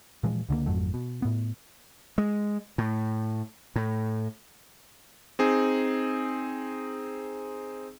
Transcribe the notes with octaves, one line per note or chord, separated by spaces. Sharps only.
A#2 E3 F3 G#3
C#2 D3 F#3 A#3
G#1 F2 F#3 A3
B2
A2 B3
G#3
A2
A2
C4 D#4 G#4